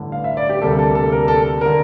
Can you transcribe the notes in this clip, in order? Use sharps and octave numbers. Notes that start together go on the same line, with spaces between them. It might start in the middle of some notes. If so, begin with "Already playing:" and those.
Already playing: A1 G2 D3 A3
F5
E5
D5
G4
D2 C3 G3 A#3 A4
A4
A4
A#4
A4
D3 A#4